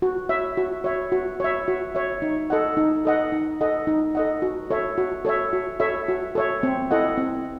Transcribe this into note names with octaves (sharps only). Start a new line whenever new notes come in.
F#4
C#5 E5
F#4
C#5 E5
F#4
C#5 E5
F#4
C#5 E5
D#4
A4 D#5 F#5
D#4
A4 D#5 F#5
D#4
A4 D#5 F#5
D#4
A4 D#5 F#5
F#4
A4 C#5 E5
F#4
A4 C#5 E5
F#4
A4 C#5 E5
F#4
A4 C#5 E5
C4
E4 A4 D#5 F#5
C4